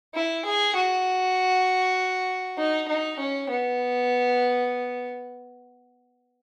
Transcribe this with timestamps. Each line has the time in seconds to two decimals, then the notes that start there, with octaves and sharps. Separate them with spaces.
0.15 E4
0.45 G#4
0.75 F#4
2.58 D#4
2.88 D#4
3.19 C#4
3.49 B3